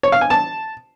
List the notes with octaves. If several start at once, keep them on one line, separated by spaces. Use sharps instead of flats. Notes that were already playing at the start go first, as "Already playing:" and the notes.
C#5
F5
G#5
A5